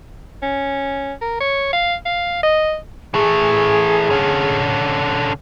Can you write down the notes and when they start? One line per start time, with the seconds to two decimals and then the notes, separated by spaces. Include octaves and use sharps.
0.42 C#4
1.22 A#4
1.40 C#5
1.73 F5
2.06 F5
2.43 D#5
3.14 E3 A3 G#4
4.11 D3 C#4